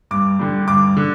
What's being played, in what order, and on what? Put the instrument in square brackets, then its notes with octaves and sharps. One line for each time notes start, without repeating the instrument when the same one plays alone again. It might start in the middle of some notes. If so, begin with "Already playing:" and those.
[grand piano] G2 D6
D3 G3
G2 D6
D3